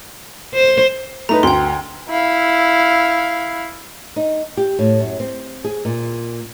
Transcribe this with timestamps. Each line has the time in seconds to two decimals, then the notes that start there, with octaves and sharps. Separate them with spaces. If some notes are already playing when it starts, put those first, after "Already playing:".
0.54 C5
1.29 A3 D#4 B4 A#5
1.43 D2 G5 C6
2.09 E4 F5
4.16 D#4
4.57 G4
4.79 A2
5.00 F#2
5.20 C4
5.64 G#4
5.85 A#2